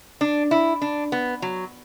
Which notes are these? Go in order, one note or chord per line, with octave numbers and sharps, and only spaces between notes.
D4
E4
D4
B3
F#3